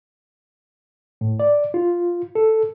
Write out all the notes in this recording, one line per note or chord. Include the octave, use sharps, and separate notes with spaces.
A2
D5
F4
A4